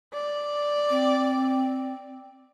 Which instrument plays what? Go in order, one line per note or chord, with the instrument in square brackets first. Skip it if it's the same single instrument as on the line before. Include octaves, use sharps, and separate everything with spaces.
[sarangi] D5
[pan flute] C4